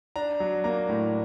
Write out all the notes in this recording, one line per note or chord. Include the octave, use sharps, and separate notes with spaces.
D4 A#5
F#3
A#3 A#5
A2